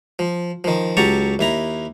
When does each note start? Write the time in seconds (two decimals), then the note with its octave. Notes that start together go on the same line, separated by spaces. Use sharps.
0.19 F3
0.64 D#3 F3
0.97 C#2 F#3 G4 A5 A#5 C#6
1.39 D#2 E4 A#5